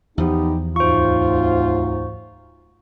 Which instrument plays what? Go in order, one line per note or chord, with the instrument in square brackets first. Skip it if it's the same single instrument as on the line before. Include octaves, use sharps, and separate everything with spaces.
[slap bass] E2 F3 [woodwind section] B3 D#4 [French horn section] G4
[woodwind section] D2 G#2 [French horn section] C3 F#3 F4 [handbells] C5 C#6